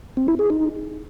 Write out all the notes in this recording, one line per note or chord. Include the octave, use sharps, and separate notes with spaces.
C4
E4
G#4
D#4